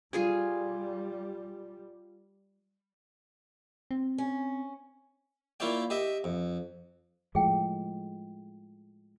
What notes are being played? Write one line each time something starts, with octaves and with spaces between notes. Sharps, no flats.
G3 F4 G#4 G#5
C4
C#4
A#3 E4 F4 C#5 D5 G5
G4 D#5 E5
F2
A2 F3 G#3 G#4 G5